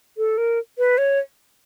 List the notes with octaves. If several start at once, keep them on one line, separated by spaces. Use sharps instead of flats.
A4
A#4
B4
C#5